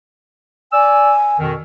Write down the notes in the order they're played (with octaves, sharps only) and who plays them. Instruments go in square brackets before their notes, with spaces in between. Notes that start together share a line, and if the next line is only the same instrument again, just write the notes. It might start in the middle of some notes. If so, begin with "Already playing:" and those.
[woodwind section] D5 E6 [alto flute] G#5
[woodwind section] F2 B2 D#3